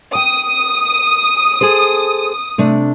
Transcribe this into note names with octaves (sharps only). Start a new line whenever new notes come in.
G5 D#6
G#4 A4 C5
C3 A3 D4